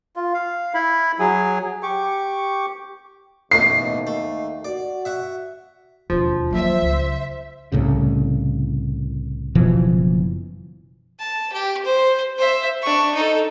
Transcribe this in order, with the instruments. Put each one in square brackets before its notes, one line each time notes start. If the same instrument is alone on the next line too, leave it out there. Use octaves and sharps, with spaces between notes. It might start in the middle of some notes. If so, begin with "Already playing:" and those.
[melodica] F4
F5
E4 B5
F#3 G#4
G4 C#6 D6
[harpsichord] A1 B2 A3 [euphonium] D#2 [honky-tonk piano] C7
[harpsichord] A3
[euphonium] F#4 [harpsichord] D5
[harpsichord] E5 F#5 C#6
[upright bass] E1 D#2 [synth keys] F3
[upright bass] F#3 A#3 [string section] C5 E5
[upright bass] C#2
[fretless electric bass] C2 A2 C#3
F#1 B2 E3 F3
[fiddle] A5
G4
C5
C5 E5
D4 C#6
D#4 A4